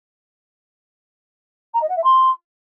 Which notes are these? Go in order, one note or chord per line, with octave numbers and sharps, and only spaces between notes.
A#5
D#5
F#5
E5
C6